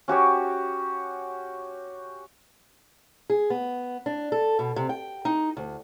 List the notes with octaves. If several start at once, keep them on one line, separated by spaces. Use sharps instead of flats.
C#4 F#4 G4 C#5
G#4
B3
D4
A4
B2
C3
G5
D#4
D2